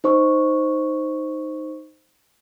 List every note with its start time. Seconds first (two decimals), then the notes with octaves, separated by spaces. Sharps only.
0.04 D#4 C5 C#6